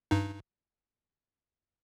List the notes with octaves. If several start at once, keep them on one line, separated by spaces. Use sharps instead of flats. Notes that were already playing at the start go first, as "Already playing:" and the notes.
G2 D#4